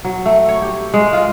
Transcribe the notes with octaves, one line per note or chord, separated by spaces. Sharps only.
F#3
A3
C#5
G4
G#3
F4